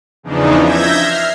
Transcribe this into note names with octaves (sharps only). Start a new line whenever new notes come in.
E2 C#3 E3 F3 D4 D#4
E5 G6 G#6 A#6
F6 C7